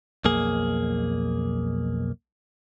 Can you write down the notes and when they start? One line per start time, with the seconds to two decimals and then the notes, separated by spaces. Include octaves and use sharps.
0.25 B1 F2 A#3 G#4